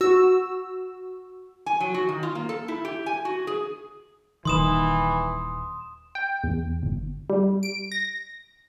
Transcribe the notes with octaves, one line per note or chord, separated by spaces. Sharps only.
F#4 E6
G#5
F#3
F#4
D#3
F4
A#3
A4
E4
G4
G#5
F#4
G#4
D#1 D#3 E3 C6 D#6 E7
G5
E2
G1
G3
D7
A#6